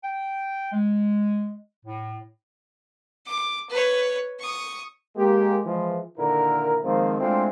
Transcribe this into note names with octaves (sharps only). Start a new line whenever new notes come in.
G5
G#3
A2
D6
B4 C#5
C#6 D#6
G#3 A#3 G4
E3 F3 G#3
A#2 D3 D#3 E4 A#4
D#3 F3 G#3 A#3 C4
G#3 A3 C4 D4 E4 F4